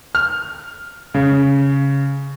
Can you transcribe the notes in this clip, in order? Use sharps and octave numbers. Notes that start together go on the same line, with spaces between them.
F6
C#3